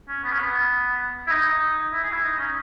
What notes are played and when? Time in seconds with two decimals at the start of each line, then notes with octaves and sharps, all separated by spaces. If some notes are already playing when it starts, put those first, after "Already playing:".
0.08 C#4
0.24 B3
0.32 C#4
0.39 B3
1.27 E4
1.31 D#4
1.93 E4
2.04 G#4
2.13 E4
2.23 D#4
2.38 C#4